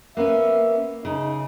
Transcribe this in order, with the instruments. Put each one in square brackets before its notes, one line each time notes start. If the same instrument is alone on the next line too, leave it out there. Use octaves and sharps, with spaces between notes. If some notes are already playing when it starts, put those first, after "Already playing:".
[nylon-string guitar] A#3 B3 C#4 [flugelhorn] E5
[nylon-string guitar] C#3 [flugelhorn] D#4